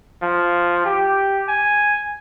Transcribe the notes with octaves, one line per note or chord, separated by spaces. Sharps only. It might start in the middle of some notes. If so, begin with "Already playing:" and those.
F3
G4
G#5